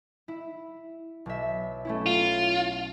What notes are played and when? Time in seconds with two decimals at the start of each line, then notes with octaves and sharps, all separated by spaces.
0.28 E4
1.26 B1 E5
1.85 A3 C#4 E4
2.06 F4